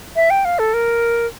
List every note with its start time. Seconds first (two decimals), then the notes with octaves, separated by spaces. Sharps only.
0.16 E5
0.30 G5
0.45 F5
0.59 A4
0.74 A#4